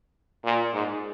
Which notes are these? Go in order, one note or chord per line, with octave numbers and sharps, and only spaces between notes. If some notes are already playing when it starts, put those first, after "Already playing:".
A#2
G#2